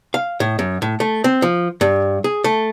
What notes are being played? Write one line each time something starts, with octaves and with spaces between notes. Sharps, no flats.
F5
A2
F#2
A2
A3
C4
F3
G2
G#4
A3